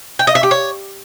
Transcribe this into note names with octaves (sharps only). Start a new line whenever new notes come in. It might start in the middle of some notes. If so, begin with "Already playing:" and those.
G5
D#5
E5
G4
C#5